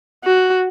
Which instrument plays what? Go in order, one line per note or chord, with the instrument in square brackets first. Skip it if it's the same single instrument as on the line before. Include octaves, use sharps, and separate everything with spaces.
[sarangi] F#4